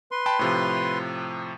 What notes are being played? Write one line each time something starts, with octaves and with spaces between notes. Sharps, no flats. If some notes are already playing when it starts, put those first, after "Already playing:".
B4 C6
G5 A5 B5
A2 C3 F3